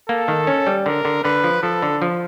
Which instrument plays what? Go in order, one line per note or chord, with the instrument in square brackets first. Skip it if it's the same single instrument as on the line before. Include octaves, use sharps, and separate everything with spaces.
[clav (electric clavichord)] A#3 [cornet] A4
[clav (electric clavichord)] D#3
C#4
G3
[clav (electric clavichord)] D3 [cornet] A#4
[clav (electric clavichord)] D3
[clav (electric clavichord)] D3 [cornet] B4
[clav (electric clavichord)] F3
[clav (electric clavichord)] F3 [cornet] A4
[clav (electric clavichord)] D3
F3